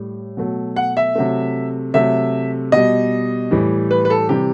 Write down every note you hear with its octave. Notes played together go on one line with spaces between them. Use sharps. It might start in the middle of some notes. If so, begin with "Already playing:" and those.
Already playing: A2 G3
B2 F#3 A3
F#5
E5
C3 F#3 A3
C3 F#3 A3 E5
B2 G3 D#5
A2 E3 G3
B4
B4
A4
C3 E3 G3 G4